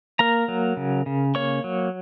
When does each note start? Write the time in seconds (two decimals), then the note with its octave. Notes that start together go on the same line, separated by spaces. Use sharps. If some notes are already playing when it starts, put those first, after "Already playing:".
0.19 A#3 A#4 A#5
0.48 F#3
0.77 C#3
1.06 C#3
1.35 A#3 C#5 C#6
1.64 F#3